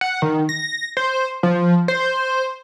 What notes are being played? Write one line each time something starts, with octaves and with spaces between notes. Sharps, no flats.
F#5
D#3
A#6
C5
F3
C5